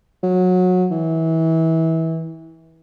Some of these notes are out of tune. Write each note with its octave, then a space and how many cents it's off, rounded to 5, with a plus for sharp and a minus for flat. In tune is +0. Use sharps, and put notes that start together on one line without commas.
F#3 -20
E3 -25